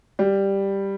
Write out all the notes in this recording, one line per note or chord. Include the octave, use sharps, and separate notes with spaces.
G3